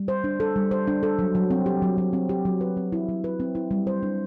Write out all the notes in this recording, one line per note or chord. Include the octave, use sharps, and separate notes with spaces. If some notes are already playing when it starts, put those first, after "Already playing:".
Already playing: G3
C5
D4
A4
G3
C5
D4
A4
F#3
F#3
C4
G4
F#3
F#3
C4
G4
F#3
B4
C4
E4
F#3
B4
C4
E4
G3
C5
D4